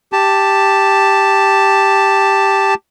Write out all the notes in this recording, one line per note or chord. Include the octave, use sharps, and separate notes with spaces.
G4 A5